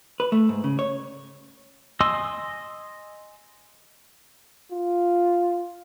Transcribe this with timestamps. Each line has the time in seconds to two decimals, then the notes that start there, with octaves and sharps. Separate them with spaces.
0.20 B4
0.32 A3
0.49 G#2
0.64 C#3
0.79 C#5
2.01 D#5 G#5 C6 D#6 E6
4.71 F4